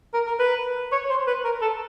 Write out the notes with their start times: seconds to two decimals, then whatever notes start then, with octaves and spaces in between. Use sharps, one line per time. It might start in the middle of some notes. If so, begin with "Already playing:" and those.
0.14 A#4
0.26 A#4
0.39 B4
0.92 C#5
1.09 C5
1.27 B4
1.44 A#4
1.61 A4